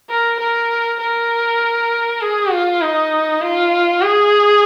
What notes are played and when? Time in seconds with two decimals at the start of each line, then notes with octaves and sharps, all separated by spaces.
0.10 A#4
0.40 A#4
1.00 A#4
2.21 G#4
2.52 F4
2.82 D#4
3.42 F4
4.02 G#4